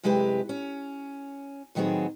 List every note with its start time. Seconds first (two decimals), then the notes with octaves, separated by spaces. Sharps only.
0.03 F#2 C3 G#3 E4 G4 B4
0.49 C#4
1.75 A2 D#3 F#3 B3 C4 G#4